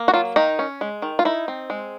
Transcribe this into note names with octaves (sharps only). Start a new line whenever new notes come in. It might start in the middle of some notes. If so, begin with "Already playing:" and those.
Already playing: A#3
F#4
F#3 F4
D#3 D#4
C#4
G#3
D#3
F4
D#4 E4
C4
G#3